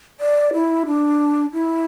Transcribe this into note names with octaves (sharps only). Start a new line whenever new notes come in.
D5
E4
D4
E4